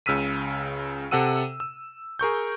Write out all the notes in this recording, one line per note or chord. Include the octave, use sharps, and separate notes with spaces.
C#2 C#3 E6 F6 B6 D#7
C3 A4 F#5 E6 D#7
E6
G#4 A#4 C#6 G6